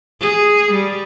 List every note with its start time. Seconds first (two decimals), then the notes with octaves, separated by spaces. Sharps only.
0.20 G#4
0.71 G3